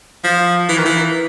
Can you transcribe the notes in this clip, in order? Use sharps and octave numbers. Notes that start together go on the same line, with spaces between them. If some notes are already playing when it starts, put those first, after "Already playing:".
F3
E3
D#3
E3